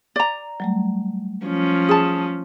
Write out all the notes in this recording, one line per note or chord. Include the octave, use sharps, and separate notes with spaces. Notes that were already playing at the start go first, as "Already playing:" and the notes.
D5 A#5
F#3 G3 A3
F3 C#4
G#4 A5